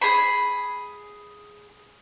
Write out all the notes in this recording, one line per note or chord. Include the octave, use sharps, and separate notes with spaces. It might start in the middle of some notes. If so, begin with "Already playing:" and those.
G#4 B5